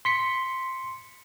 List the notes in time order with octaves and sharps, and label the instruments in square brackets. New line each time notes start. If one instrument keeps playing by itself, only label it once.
[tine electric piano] C6 B6 C#7